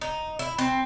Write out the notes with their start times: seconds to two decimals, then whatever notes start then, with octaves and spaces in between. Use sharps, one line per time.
0.01 D#4
0.39 E4
0.58 C4